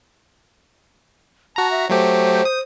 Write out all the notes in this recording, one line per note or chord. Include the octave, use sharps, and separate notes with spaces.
F#4 A5 A#5
E5
F#3 A3 G4 C5
D#6